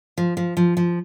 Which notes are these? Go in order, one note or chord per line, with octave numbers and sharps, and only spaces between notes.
F3
F3
F3
F3